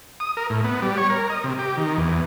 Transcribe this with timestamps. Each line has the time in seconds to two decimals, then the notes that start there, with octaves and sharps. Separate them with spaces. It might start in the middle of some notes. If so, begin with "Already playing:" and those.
0.20 D#6
0.37 A#4
0.50 A2
0.64 B3
0.82 G3
0.98 C#5
1.10 A#4
1.30 D#5
1.44 C3
1.59 G4
1.77 D#3
1.97 E2